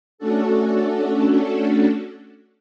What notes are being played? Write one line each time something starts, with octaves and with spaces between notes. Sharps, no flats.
A3 C#4 D4 F#4 A4